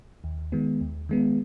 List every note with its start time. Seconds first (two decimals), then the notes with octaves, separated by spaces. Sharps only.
0.24 D#2
0.52 D#3 G#3 B3
0.81 D#2
1.09 D#3 G#3 B3